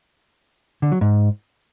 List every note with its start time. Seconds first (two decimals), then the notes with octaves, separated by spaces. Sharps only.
0.82 D3
0.92 F#3
1.01 G#2